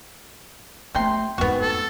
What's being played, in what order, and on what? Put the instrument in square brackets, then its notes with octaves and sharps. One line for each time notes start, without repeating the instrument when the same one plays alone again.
[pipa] C3 G5 C6 [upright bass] A3 C#4
[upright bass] F2 G#2 [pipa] B3 F#4
[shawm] A4